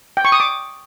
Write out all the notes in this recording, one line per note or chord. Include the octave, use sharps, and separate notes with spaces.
G5
C#6
D#6
D6